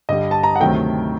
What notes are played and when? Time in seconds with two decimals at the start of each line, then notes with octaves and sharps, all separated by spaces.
0.09 G2 D3 G3 D#5
0.31 A5
0.43 A#5
0.56 F#5
0.60 D2 C3 D#3 F#3 A3 G5